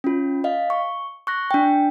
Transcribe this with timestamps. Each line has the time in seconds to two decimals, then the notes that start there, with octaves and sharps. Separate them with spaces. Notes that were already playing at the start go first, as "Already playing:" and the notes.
0.04 C#4 F4
0.44 D#5 F5
0.70 C#6
1.27 C#6 F#6 A#6
1.51 D4 G5